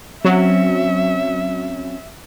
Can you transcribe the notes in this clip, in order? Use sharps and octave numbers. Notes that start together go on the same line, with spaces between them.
F#3 C4 C#4 E5